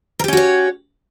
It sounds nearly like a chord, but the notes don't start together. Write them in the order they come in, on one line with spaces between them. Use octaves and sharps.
A#4 G4 C#4 F#4 C#5